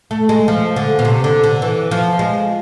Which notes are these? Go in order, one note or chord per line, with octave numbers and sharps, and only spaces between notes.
A3
G#3
F3
D3
B2
C3
D3
D3
E3
F3
G#3